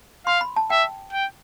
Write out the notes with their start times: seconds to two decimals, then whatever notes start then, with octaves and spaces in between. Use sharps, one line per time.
0.26 F5 C6
0.41 B5
0.56 A5
0.70 E5 G5
1.13 G5